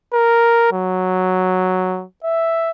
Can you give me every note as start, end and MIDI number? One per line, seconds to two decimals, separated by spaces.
0.13 0.70 70
0.73 2.04 54
2.24 2.71 76